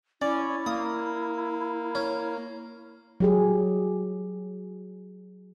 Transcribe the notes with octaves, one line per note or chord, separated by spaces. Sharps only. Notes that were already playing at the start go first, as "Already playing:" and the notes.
C#4 E4 D5
A#3 D#6
C#4
F#3 G4 G#4